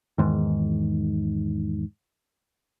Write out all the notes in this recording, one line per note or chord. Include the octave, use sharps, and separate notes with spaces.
E2 G#2 D#3